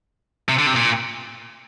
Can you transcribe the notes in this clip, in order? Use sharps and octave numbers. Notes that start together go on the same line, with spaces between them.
C3
D3
C3
A#2